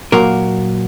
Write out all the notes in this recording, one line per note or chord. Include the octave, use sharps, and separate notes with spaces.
A#2 F#3 A#3 F#4 A#4